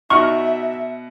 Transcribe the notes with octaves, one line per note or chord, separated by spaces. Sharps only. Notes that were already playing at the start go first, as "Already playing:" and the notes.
B2 D#4 F#4 D5 E5 F#5 C#6 F6